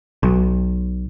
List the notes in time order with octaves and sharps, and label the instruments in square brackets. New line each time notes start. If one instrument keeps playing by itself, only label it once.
[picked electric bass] B1